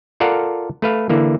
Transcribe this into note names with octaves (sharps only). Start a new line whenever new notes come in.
F4 A4 A#4 D5 F5 F#5
A3 B4 F5
D3 E3 A#3